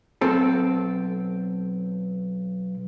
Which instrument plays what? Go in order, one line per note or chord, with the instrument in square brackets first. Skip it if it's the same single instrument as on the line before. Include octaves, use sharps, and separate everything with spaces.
[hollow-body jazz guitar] B1 C4 A4